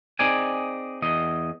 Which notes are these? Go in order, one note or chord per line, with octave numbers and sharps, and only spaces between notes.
C4 D#4 G#4 D5 G#5
E2 D#5